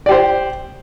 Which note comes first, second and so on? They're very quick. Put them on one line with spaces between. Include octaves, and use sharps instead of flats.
D5 G4 C5